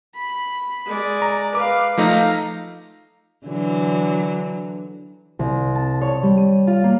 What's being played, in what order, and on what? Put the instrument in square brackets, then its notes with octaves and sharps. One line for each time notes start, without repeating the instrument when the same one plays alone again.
[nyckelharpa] B5
G#3 D5
[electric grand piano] A#5
[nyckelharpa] B4 F5 [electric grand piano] D6
[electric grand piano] F3 A3 D#4 [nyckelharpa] F5 A#5
[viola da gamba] D3 E3 F#3
[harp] C2
A5
C#5
G3
D#7
F4
A#3